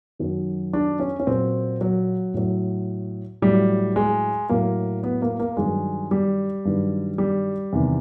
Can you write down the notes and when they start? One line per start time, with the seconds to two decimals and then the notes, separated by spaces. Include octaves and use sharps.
0.19 F#2 D#3 F#3
0.73 D4
1.00 C#4
1.20 C#4
1.27 A#2 F#3 C4
1.81 F#3
2.34 A2 F#3
3.42 A2 F#3 G3
3.96 G#3
4.49 A2 F#3 A#3
5.03 B3
5.22 A#3
5.40 A#3
5.57 G2 D#3 F#3 G#3
6.11 G3
6.65 G2 D#3 F#3
7.18 G3
7.73 E2 C3 D#3